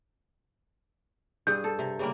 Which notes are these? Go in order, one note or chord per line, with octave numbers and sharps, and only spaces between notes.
G2 G#4 G6
A4
C3
C#3 G3 A#3